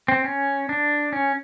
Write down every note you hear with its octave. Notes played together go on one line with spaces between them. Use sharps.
C4
C#4
D4
C#4